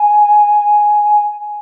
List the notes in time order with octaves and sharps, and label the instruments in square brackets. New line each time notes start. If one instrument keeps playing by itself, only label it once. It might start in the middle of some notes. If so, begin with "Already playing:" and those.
Already playing: [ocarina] G#5